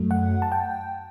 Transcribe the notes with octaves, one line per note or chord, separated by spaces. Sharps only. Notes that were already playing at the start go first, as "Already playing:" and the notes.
Already playing: F#2 F#3 A3
F#5
A5
G5